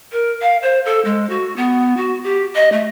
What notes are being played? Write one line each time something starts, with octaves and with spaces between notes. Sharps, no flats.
A#4
F5
C5
A4
G#3
F#4
B3
F#4
G4
D#5
A3